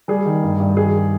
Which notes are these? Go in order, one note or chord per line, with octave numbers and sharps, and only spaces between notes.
G3 G#4
D#3
G2
G2
D#3 G#4